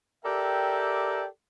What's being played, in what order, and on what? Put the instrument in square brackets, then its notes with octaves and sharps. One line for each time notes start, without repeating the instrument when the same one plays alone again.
[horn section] G4 A4 A#4 D5 E5 G5